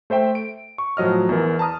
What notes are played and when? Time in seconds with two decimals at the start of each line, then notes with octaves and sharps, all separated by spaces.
0.10 A3 C5 E5 G5
0.35 D7
0.78 C#6
0.97 A2 F3 F#3 D#5 F6
1.29 E2 E3 A#4
1.59 A5 A#5 D#6 F6